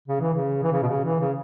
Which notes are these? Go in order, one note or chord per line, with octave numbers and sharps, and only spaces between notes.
C#3
E3
C#3
E3
C#3
B2
C#3
E3
C#3